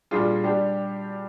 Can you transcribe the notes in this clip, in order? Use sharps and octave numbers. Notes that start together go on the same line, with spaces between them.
A#2 G3 D4 F4 G#4
G3 D4 G4